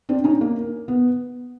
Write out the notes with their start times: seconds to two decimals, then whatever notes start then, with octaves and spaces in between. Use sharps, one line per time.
0.09 C4 D4
0.24 C#4 D#4
0.41 A#3
0.88 B3